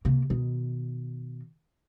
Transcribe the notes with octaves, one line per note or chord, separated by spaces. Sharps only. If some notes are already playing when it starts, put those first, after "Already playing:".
C3 A#3
B2 D#3